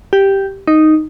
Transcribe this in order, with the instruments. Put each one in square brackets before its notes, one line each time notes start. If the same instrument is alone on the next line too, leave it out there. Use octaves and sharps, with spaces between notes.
[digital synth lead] G4
D#4